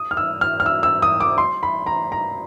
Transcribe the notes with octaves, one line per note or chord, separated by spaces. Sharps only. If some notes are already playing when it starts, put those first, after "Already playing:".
Already playing: D#6
F6
E6
F6
F6
E6
E6
D#6
D6
C6
B5
A#5
A#5